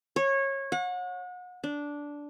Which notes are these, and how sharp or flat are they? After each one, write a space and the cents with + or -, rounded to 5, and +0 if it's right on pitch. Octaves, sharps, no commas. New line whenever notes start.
C#5 -20
F#5 -35
D4 -10